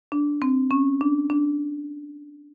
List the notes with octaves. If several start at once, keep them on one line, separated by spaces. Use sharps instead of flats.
D4
C4
C#4
D4
D4